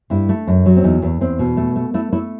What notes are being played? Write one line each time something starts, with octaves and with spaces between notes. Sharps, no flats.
G2 E4
A3
F#2
F#3
C4
E2 D#4
E2
E2 C4
B2
A3
A3
A3 E4
A3 E4